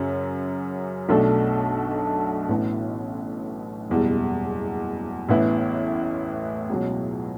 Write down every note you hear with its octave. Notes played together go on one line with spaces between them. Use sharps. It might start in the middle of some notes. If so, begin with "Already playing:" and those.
Already playing: F#2 C#3 F#3 C#4
B1 B2 A3 D4 A4
A1 A2 E3 B3
F#1 E2 B2 G3
A1 A2 E3 B3 E4
C#2 B2 F#3